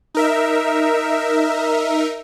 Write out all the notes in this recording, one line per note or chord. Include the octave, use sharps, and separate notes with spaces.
D#4 A#4 E5